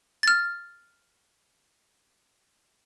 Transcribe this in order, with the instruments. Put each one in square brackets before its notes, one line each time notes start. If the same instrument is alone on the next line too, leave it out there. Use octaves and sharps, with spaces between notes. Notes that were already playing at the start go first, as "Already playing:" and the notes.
[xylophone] F6 A6